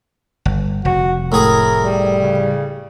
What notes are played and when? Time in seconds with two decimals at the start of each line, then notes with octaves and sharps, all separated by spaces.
0.45 G1
0.85 F1 F#4
1.32 A2 G#4 A#4
1.79 G3
2.21 C#3